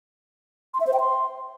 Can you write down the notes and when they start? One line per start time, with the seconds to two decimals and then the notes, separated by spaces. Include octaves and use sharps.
0.74 C6
0.80 E5
0.87 C5
0.93 G5
1.00 C6